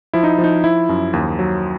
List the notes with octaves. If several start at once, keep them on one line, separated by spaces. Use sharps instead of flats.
F3 E4
D#4
F3
D#4
F3 E4
F#2
D#2
F#3